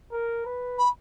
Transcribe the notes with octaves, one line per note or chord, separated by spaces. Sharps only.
A#4
B4
B5